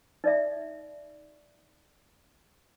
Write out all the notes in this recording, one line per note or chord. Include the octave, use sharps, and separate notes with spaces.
D#4 D5 E5